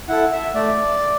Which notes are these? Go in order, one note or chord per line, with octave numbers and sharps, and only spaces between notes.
E4 A4 F#5
E5
A3 D5